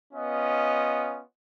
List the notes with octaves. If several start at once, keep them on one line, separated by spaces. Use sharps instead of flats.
B3 C#4 F4 D#5